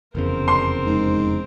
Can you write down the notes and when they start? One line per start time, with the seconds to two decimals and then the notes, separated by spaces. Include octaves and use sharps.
0.15 F1 E2 C#3 C4 A#4
0.48 C6
0.86 G#2